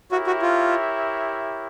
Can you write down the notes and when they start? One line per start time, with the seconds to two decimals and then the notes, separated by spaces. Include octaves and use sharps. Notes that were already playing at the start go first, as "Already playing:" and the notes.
0.12 E4 F#4 G4 A#4 C#5 E5
0.27 F#4
0.42 F4